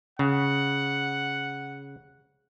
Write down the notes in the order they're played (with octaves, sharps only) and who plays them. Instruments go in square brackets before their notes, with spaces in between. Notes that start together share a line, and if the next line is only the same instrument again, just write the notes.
[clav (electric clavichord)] C#3 [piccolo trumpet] F#5